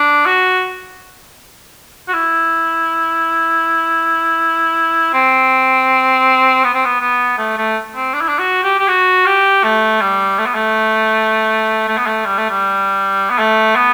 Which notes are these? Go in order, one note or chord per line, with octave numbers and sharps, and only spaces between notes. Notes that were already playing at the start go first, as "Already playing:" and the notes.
Already playing: D4
F#4
F#4
E4
C4
B3
C4
B3
B3
A3
A3
C4
D4
E4
D4
F#4
G4
G4
F#4
G4
A3
G3
A3
B3
A3
A3
B3
A3
G3
A3
G3
B3
A3
B3